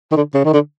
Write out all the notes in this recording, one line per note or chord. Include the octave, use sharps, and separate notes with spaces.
D#3
D3
C#3
D#3
D3